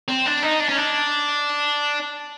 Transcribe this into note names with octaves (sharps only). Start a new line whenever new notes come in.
C4
D4
D#4
D4
C#4
D4